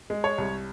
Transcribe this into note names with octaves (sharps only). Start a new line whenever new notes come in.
G#3
C#5
C2